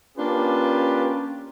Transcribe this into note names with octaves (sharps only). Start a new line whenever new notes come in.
A#3 C#4 D4 F4 G4 B4